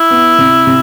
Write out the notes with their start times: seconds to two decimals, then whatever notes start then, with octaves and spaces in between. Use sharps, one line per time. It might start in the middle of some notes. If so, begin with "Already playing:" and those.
Already playing: E4
0.11 B3
0.38 C3
0.67 C3